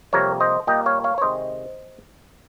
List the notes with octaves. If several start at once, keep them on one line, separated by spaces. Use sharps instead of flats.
F2 C3 G3 A#3 A#4 C#5
C5 D#5
A#2 G3 A#3 D#5 G5
C#5 F5
C#5 F5
C#5
C3 D#3 G#3 C5 D#5